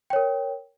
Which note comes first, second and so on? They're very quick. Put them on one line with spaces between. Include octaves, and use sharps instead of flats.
G5 C#5 A#4